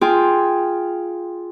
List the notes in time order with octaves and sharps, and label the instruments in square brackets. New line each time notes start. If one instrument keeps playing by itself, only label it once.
[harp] F4 G#4 G5